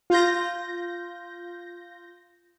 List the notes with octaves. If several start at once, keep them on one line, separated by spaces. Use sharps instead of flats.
F4 G6 A#6